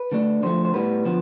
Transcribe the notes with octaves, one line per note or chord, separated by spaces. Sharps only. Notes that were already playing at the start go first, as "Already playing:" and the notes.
Already playing: B4
D3 A3 D4
D3 F3 A3 C5
C5
A2 G3 B3 B4
D3 F3 B3